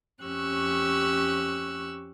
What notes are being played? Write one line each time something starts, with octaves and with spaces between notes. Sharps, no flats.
F2 C#4 G4 C#6 E6 F#6